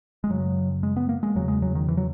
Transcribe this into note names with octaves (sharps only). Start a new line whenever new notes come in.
G#3
F#2 C#3 F#3
G#3
B3
A#3
G#3
E2 C#3 F#3
G#3
F#3
D#3
E3
F#3